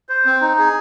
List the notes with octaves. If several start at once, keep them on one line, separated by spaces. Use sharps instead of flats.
C5
C4
D#4
G#4